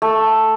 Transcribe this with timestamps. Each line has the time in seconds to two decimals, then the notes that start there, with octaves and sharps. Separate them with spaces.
0.02 A3